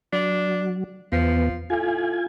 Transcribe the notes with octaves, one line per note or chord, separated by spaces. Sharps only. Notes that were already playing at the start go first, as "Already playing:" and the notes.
F#3 D4
E2 F3 B3
A2 F4 G#5